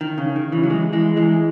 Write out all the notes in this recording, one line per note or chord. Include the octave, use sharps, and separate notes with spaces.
D#3
C#3
D#3
C#3 E3
F#3
E3 G#3
E3 G#3
E3 G#3